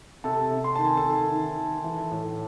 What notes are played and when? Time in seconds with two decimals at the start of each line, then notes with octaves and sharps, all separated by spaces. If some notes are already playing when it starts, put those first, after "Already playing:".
0.24 C3 A4 A5
0.51 C3
0.64 C6
0.76 D#3 A5
0.87 G#5
0.97 A4 A5
1.04 D#3
1.32 D#3
1.58 D#3
1.84 E3
2.11 A2